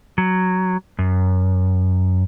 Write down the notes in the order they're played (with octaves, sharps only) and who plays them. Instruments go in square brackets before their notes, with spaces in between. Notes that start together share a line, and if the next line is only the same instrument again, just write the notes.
[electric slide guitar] F#3
F#2